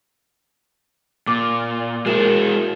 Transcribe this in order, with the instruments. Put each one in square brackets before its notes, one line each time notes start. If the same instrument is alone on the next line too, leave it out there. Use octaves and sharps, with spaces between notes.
[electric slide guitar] A#2 [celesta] D6
[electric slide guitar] G#3 E4 [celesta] F#4 A#4 E7